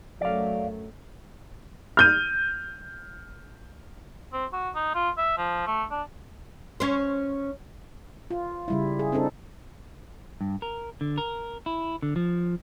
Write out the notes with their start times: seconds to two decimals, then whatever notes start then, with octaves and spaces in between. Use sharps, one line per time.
0.21 F#2 F#3 A3 D5 F5
1.97 F6 G6 D#7
4.33 C4
4.53 F#4
4.75 D#4
4.95 F4
5.18 E5
5.37 F3
5.66 A3
5.91 D4
6.80 C#4 C5
8.31 F4
8.68 C#3 G3 E4
8.99 G#4
9.12 C4 D4 D#4 A4
10.41 G2
10.62 A#4
11.01 D3
11.18 A#4
11.66 E4
12.03 D3
12.16 F3